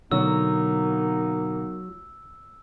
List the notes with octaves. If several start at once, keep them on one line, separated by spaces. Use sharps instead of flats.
B2 D3 F#3 A#3 B3 D#4 E6